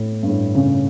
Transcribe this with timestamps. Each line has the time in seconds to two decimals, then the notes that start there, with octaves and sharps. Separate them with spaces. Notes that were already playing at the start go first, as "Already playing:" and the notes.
Already playing: A2
0.23 G2
0.29 A2
0.55 C#3